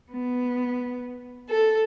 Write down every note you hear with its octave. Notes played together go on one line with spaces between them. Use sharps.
B3
A4